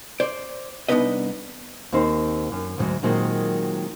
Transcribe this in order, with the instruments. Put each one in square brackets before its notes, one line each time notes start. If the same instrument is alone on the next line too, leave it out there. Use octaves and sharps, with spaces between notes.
[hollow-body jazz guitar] C5 D5
C2 B3 D4 D#4 B4 D#5
[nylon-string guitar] D#2 C4 D#4 C5
F#2
D2 G#2 E3 F#3
A#2 D#3 F#3 G#3 C4